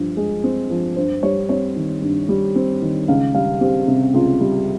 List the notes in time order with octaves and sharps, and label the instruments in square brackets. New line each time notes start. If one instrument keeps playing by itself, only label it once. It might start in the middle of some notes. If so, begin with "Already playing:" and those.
Already playing: [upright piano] G2 F3
G#3
C4
F3
G2 C5
G3 C#5
C4 C#5
D#3
G2
G3
C4
D#3
C#2 F5
G3 F5
C4 G4
C3
C#2 F4
G3